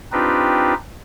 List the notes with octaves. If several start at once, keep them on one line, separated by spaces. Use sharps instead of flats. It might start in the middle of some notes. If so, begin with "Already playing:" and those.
C4 D4 D#4 F4 G4 B4